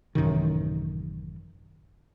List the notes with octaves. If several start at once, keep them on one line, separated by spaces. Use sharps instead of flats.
A1 F#2 C3 D#3